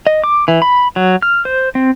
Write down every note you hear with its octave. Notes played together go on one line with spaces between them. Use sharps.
D#5
D6
E3
B5
F#3
F6
C5
C4